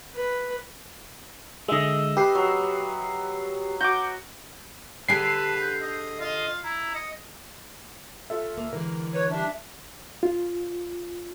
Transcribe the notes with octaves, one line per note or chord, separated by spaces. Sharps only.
B4
D3 G#3 D#5 E5
G4 B4 C7
F#3
F#4 D6 G6
D3 G4 G#4 B4 A5 C7
G6
D#5
F4 D#5
E4 A#5
D#5 C#7
F4 A4 E5
D2 A#3
D3 E3 G#3 A#4
B4 C#5
G3 D4 E5
F4